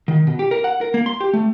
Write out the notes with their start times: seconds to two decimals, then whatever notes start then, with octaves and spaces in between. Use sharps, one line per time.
0.08 D#3
0.27 B2
0.39 G4
0.51 A#4
0.64 F#5
0.81 A#4
0.94 A#3
1.06 C6
1.21 G4
1.33 A3